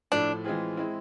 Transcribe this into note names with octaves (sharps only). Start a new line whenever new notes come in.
A2 F3 A3 D4
E3 G#3 C4 F4 G#4
G#3 C4 E4